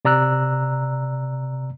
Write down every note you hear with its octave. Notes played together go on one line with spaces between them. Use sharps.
C3 D5 A#5 E6 F#6